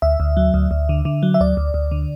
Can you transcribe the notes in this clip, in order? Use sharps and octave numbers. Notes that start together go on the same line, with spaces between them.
D2 E5
D2
F#3
D2
D2
D3
D3
F#3
E5
D2 D5
D2
D2
D3